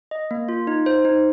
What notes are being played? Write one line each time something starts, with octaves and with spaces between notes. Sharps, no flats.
D#5
A#3
F4
D#4
C5
D#4